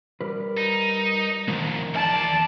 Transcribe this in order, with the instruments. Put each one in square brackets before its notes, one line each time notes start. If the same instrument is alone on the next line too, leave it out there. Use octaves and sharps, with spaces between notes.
[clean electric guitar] G3 A#4 B4
[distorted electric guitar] D#4
[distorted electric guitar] C2 F2 [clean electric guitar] D#3 F3 A#3
[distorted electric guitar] E2 D5 [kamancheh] A5